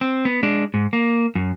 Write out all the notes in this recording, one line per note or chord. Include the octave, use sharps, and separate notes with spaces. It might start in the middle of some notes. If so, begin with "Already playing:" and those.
C4
B3
G#3 D4
G#2
A#3
F#2